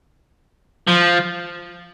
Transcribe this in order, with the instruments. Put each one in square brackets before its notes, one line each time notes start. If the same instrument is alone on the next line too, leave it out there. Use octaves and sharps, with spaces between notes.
[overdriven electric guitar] F3